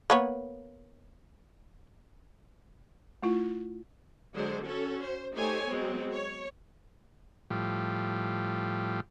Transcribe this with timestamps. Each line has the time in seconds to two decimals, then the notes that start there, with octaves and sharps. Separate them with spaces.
0.10 A#3 B3 C#5
3.23 A3 E4 F4
4.36 D3 F#3 G#3 C5
4.66 C#4 F#4 A4
5.05 C5
5.35 A3 D#4 G4 C5 C#5 G#5
5.69 F#3 G#3 B3 C4
6.13 C#5
7.50 A2 F3 G3